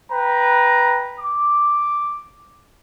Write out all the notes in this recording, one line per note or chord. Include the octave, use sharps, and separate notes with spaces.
B4 G5 A#5
D6